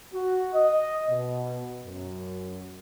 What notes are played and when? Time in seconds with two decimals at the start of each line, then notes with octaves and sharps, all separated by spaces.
0.14 F#4
0.54 D#5
1.10 B2
1.85 F#2